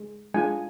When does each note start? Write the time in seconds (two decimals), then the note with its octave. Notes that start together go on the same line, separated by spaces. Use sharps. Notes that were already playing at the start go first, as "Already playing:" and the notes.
Already playing: G#3
0.34 G#3 D4 F4 G#5